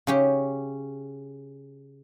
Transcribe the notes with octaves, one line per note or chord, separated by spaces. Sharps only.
C#3 C#4 G4